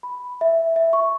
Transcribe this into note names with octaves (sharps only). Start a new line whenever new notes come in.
B5
E5
E5
C#6